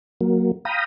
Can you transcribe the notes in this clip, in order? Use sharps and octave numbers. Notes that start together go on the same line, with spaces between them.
F#3 A#3
F5 G5 A#5 B5 D#6